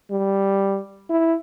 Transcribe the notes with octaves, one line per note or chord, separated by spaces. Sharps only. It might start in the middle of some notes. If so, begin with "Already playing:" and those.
G3
E4